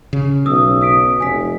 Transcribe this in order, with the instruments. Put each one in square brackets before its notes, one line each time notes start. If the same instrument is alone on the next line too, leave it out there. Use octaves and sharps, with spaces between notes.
[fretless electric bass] C#3
[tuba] B1 [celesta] D#6 E6
[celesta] D#6 B6 D7
[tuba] F1 [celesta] G#5 B6